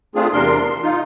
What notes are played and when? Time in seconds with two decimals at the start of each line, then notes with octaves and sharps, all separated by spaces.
0.15 A3 C4 D4 F4 G#4
0.33 E2 C3 D4 A#4 C6
0.61 C6
0.83 D#4 F4